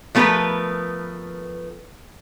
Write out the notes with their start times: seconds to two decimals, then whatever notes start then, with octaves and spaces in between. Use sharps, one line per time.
0.15 F3 A3 B3 G4 A#4 B4